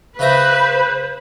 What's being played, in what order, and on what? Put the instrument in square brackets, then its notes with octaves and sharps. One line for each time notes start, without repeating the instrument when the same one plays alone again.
[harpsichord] C#3 E5 A#5 [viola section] B4 [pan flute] C5